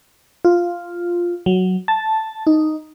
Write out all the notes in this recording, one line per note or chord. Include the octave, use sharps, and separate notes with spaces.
F4
F#3
A5
D#4